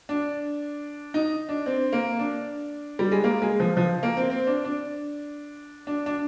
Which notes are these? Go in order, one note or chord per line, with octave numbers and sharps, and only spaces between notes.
D4
D#4
D4
C4
A#3
D4
G3
G#3
A#3
G#3
F3
F3
A#3
C4
C4
D4
D4
D4
D4